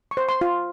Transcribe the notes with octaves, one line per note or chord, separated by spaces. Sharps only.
C#6
C5
C6
F4